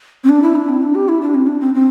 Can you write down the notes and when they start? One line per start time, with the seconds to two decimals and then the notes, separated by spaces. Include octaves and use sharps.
0.24 C4
0.29 D4
0.42 E4
0.55 D4
0.69 C4
0.82 D4
0.95 G4
1.08 E4
1.21 D4
1.34 C4
1.47 D4
1.60 C4
1.74 C4